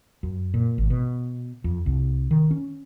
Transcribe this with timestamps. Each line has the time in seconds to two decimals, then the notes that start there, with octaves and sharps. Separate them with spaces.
0.23 F#2
0.54 A#2
0.78 G#1
0.90 B2
1.64 F2
1.86 C2
2.31 D#3
2.51 C#4